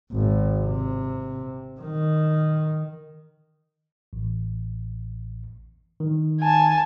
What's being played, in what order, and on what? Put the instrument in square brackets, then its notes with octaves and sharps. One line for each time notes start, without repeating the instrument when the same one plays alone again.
[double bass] G#1
C3
D#3
[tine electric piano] A1
D#3
[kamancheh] G#5 A5